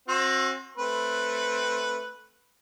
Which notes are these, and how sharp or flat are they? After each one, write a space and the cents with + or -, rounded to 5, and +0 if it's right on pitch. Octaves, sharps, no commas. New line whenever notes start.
C4 +30 F#4 -25
A3 +0 C4 +10 B4 +0